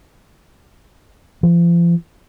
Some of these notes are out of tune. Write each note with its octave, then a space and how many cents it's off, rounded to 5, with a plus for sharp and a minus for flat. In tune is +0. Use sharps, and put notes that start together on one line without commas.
F3 -40